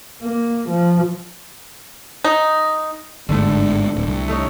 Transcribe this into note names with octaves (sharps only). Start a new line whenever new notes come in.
A#3
F3
D#4
G1 G#2 D3 A3
D1
C2
A3 D#4 C#5